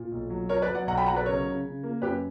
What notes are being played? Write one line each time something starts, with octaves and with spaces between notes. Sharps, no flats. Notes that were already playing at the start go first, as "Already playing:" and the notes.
Already playing: A#2
B1
F#3
F#3 A#4 C#5
B4 D5
F#3
D5 F#5
B1 F#5 A#5
G5 B5
F#3 F#5 A#5
B4 D5
C#3 A#4 C#5
C#3
C#3
A#3
F#2 G4 B4